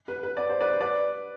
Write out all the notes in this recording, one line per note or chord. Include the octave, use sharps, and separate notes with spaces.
B4
B4
D5
C5
B4 D5
B4 D5